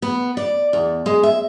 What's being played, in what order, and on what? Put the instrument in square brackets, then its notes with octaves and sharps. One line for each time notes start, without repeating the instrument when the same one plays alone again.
[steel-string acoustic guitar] B3
D5
E2
G#3
E5